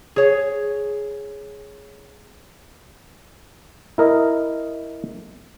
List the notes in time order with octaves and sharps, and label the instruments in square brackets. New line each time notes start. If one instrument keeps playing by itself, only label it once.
[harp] G#4 C#5
[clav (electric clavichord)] E4 A#4 D#5